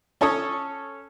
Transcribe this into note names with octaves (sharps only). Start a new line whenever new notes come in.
C#4 A4 C#5 D#6